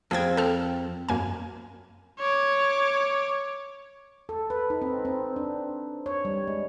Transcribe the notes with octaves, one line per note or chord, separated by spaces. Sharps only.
F2 C4 G#4 G#6
A4 F6
F#2 A#3 G#5
C#5 D6
A4
B4
D#4
C4
C4
D4
C#5
G3
G#3